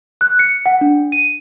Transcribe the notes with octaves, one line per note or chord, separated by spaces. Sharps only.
F#6
C#7
F#5
D4
D#7